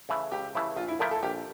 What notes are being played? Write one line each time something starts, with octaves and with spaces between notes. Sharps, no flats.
C#3 E3 A3 E4
C#2 G4
C#3 E3 A3 E4
A#1 F4
E4
A#2 F3 A3 E4 A#4
A4
A#1 G4